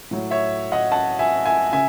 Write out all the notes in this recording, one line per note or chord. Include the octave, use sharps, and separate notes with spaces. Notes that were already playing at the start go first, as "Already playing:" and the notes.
A2 F#3
C#5 E5
D#5 F#5
F#5 A5
E5 G#5
E5 G#5
C#3 E5 G#5